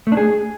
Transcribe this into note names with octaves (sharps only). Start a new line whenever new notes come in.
A3
D4
G#4